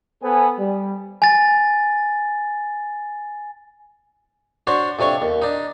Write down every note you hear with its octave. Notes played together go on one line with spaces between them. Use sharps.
B3 A4 B4 C5 G#5
G3
G#5 A6
D4 F#4 C5 C#5
F2 C3 D4 C#5 C#6
D#2
D4 D#4